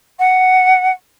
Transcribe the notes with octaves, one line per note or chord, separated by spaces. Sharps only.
F#5